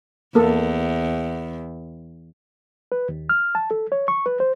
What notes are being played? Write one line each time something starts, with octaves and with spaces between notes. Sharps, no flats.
E2 A#3 A4
B4
D#2
F6
A5
A4
C#5
C#6
B4
C5